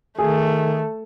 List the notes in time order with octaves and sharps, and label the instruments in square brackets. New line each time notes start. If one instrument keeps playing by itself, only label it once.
[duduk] D#3 [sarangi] A3 [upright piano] G#4